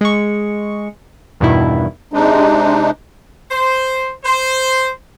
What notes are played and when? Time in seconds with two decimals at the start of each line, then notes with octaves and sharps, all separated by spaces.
0.01 G#3 C#6
1.40 E2 G2 B2 D#3 E4
2.13 C3 G#3 D4 D#4
3.50 C5
4.24 C5